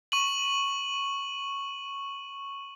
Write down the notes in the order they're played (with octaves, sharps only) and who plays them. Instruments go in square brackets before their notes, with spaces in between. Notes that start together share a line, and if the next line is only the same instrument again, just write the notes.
[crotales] C#6 D#7 F#7